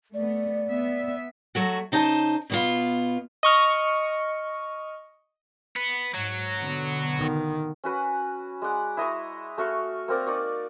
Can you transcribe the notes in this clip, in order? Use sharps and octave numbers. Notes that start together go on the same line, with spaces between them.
A3 B3 D5
B3 E5
F#3 A3 F#4
C#3 D#4 C5 C#5 A5
B2 B3 F4
D#5 C#6 F6
B3
G#2 F#3
B2 D3 B3
D#3
C#4 F#4 B4 F#5
G#3 D5 F#5
E4 D#5 A#5 C#6
A3 F#4 F5 C#6
A#3 C4 A#4 D5
D#4 D5 C#6